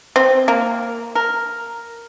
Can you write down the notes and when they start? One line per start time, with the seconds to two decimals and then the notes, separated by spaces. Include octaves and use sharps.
0.16 C4
0.48 A#3
1.15 A#4